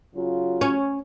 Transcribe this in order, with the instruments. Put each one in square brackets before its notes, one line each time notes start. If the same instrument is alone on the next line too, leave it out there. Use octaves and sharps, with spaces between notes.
[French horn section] C#3 F#3 F4
[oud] C#4